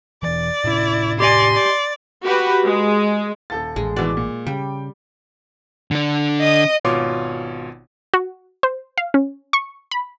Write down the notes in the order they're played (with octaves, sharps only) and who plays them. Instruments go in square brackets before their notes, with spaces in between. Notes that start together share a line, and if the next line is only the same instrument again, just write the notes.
[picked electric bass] E1 E3 [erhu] D5
[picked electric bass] A2 C3 C#4 [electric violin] E4
[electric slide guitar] G4 D#5 G#5 [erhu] D5 [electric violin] C6
[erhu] D5
[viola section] F#4 G4 B4
G#3
[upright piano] D#1 A4 A6
[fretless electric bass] A1 [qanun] G#3
[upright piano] B2 E3 F#4 [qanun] D5
[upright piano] A#2
[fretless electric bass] C#3 [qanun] G3 [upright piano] G5
[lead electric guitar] D3 D4
[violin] D#5 D#6
[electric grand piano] G#1 B2 F4 C#5 C6 D6
[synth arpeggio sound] F#4
C5
F5
C#4
C#6
B5